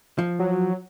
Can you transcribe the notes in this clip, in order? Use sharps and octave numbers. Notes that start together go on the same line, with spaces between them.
F3
F#3